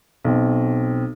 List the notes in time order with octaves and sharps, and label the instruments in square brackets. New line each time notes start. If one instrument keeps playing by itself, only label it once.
[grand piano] B1 C4